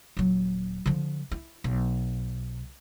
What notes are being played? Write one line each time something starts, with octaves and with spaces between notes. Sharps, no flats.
D#1 F#3
D3 F3
E4
B1